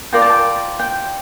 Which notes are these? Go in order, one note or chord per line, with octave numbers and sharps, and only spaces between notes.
F4 A#4 D5 G5
A5
G5
G5